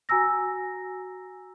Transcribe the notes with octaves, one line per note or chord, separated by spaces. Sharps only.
F#4 G#5 A#5 E6 A#6